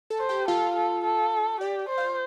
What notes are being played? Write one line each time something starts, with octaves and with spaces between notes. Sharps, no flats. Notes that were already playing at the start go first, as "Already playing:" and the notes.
A4 A5
C5
G4 G5
F4 A4 F5
A4
A4
G4 D5
D5
C5
F4 F5